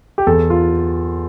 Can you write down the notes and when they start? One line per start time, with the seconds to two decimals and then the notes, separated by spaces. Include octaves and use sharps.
0.18 G4
0.27 E2 A4
0.50 F4